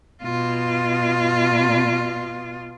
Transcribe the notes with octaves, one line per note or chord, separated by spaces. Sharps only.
B2 F4